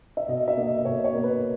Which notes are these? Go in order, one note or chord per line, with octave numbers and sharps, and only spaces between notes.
E5
B2 D#5
E5
A#3
D#5
B2 C#5
C#5
A#3
B4